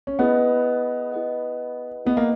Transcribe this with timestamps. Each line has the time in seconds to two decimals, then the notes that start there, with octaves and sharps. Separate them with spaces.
0.07 C#4
0.19 B3 E4 G#4 B4 D#5 F#5
1.12 E4 G#4 B4 D#5 F#5
2.05 B3 E4 G#4 B4 D#5 F#5
2.17 A#3